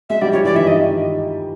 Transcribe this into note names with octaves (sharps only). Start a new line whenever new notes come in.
G#3 E5
G3 D5
F3 C#5
E3 D5
D#3 E5
D#3 D#5